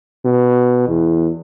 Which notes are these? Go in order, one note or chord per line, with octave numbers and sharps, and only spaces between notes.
B2
E2